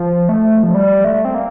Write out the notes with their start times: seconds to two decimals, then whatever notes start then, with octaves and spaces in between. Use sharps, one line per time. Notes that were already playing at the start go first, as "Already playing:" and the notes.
Already playing: F3
0.29 A3
0.63 F3
0.74 G3
1.04 A3
1.25 C4
1.34 A#3